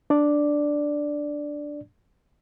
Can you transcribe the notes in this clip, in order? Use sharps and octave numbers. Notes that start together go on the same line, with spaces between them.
D4 D5